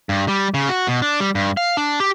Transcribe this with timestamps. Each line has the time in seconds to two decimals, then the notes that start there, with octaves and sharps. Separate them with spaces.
0.09 G2
0.28 G3
0.54 C#3
0.69 F#4
0.88 B2
1.02 D4
1.20 G3
1.35 G2
1.57 F5
1.77 D4
2.00 G4